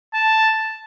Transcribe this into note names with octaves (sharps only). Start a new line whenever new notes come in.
A5